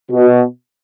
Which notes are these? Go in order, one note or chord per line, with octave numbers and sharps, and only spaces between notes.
B2 F#4